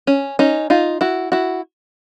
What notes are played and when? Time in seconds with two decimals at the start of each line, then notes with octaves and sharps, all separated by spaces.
0.07 C#4
0.39 C#4 D#4
0.70 D#4 F4
1.01 E4 F#4
1.32 E4 F#4